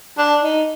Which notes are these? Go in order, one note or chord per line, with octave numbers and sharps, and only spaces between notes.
D4
D#4